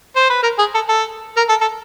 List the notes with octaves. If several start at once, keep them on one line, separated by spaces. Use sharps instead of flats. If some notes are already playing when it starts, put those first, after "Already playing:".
C5
B4
A#4
G#4
A4
A4
A#4
A4
A4